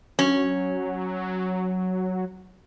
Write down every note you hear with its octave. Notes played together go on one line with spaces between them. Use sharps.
F#3 C#4